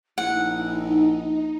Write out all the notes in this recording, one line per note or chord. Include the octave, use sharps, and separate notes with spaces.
A#1 D#4 E4 F#5